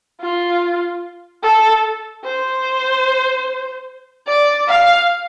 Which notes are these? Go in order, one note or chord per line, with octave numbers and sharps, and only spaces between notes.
F4
A4
C5
D5
F5